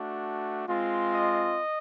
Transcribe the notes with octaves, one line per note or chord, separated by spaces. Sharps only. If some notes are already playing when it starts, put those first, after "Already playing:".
Already playing: A3 D4 F#4
G#3 C4 F4
D#5